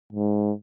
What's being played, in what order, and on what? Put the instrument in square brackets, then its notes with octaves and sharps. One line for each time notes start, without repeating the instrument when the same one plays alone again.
[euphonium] G#2